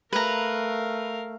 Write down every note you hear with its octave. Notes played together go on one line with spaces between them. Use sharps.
A3 A#4 B4 F5 A#5